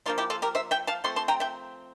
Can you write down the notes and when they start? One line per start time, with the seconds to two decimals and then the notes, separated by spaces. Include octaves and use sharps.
0.06 F3 A#3 D4 F4
0.18 E4 G4
0.30 F4 A4
0.42 G4 A#4
0.55 C5 E5
0.71 E5 G5
0.87 F5 A5
1.04 F3 A3 C4 C6
1.16 A5 C6
1.28 G5 A#5
1.40 E5 G5